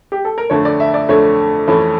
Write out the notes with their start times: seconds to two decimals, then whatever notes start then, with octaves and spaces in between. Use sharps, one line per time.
0.12 G4
0.25 A4
0.38 A#4
0.50 F2 D3 A3 C#5
0.65 D5
0.80 E5
0.94 D5
1.09 F2 D3 A3 C#5
1.68 F2 E3 A3 C#4